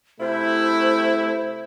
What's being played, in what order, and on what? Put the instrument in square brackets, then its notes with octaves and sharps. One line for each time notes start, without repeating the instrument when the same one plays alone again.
[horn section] C3 A3 E4 [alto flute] C5